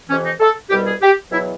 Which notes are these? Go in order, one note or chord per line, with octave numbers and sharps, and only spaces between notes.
F2 C3 E3 C#4
D#4
A4
C2 B2 G3 G4
G#4
G4
E2 B2 F#3 E4